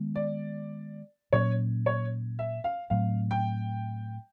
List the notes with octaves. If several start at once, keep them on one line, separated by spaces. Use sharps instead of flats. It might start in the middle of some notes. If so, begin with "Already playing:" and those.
Already playing: D#3 G#3 B3
D5
A#2 F#3 A#3 C#4 C#5
C#5
E5
F5
A2 F#3 A3 C4 F5
G5